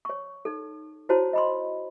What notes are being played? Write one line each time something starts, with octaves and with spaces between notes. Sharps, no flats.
C#5 C#6
D#4 A4
E4 F#4 C5 C#5 A5
D#5 B5 C6